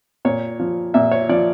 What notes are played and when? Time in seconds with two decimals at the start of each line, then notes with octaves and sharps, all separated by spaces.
0.25 A#2 C#5
0.60 F3
0.94 A#2 E5
1.11 C#5
1.29 F3 D5